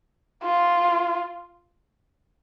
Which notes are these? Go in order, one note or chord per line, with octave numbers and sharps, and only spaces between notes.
F4